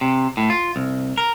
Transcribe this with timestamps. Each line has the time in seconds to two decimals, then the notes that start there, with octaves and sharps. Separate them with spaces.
0.01 C3
0.37 A2
0.50 F4
0.76 C2
1.18 A#4